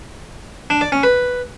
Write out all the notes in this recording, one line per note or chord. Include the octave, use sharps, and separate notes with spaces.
D4
D5
C#4
B4